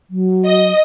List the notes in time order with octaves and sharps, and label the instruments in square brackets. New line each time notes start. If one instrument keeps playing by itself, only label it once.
[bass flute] F#3
[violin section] D#5